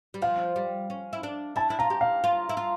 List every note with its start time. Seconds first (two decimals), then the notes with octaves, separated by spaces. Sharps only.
0.14 G3
0.22 F3 F5
0.56 G3
0.90 C#4
1.13 E4
1.23 D4
1.56 E4 A5
1.70 E4
1.79 F4 A#5
1.90 G4
2.01 F5
2.24 F4
2.49 E4
2.57 F4